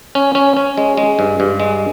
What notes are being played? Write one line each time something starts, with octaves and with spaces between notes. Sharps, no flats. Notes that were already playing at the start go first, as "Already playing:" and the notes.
C#4
C#4
C#4
G#3
G#3
G2
G2
G#3